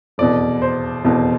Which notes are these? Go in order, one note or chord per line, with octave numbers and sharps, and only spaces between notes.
F1 E2 B2 D5
C5
F1 E2 B2